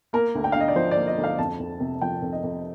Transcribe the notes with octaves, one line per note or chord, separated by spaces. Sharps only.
A#3 A#4
D2
G5
F5
D3
D#5
D5
F3 C5
D5
A#3
D#5
D2
F5
F2 A5
F2
C3
F3 G5
F2
D#5
F2